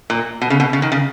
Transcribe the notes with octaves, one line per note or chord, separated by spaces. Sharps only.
A#2
B2
C#3
B2
C#3
D#3
C#3